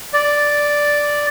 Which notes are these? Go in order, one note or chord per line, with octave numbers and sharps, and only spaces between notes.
D5